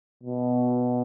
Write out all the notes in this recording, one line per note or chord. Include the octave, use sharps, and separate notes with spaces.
B2